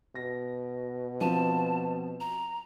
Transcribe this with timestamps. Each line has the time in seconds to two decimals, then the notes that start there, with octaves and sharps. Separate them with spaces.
0.15 B2 A#6
1.21 F3 C4 A5 D#7
2.20 A#5